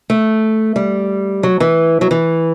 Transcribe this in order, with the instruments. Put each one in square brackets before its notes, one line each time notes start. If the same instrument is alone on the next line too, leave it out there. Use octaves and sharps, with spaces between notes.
[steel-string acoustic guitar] A3
G3
F#3
E3
F#3
E3